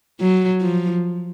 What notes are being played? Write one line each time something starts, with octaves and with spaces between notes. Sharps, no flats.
F#3
F3